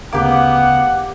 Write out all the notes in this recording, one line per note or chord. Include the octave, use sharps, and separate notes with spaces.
D2 C#3 A#3 B3 G4 F#5 D6